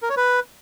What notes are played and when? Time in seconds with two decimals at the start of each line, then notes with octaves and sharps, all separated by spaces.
0.02 A#4
0.10 C#5
0.17 B4